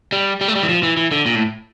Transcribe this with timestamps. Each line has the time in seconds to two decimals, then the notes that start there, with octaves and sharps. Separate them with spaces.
0.12 G3
0.41 G3
0.48 A3
0.55 G3
0.63 E3
0.69 F3
0.83 E3
0.97 E3
1.11 D3
1.26 A#2
1.35 A2